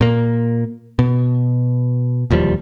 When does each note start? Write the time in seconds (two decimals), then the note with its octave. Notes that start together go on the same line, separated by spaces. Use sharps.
0.01 A#2 A#3
0.99 B2
2.31 E1 D#2 F3 G3